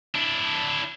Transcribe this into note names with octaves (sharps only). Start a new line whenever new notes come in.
D4 E4